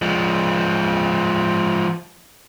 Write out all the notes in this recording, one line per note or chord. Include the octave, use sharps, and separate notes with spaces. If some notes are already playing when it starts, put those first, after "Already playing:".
F3 G#3